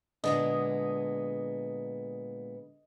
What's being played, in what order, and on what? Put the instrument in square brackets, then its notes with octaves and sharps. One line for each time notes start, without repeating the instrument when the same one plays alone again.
[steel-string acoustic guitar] A#2 G#3 B3 [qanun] D3 D4 [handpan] D#5